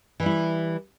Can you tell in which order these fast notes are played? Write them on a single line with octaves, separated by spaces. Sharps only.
E3 G3 E4